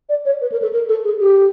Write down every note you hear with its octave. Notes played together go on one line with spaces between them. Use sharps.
D5
C#5
B4
A#4
A4
A#4
A4
G#4
G4